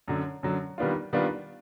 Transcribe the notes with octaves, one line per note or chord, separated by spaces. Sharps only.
F#2 D3 F#3
F#2 D3 F#3
D#3 G3 B3 D4 F4
D#3 G3 B3 D4 F4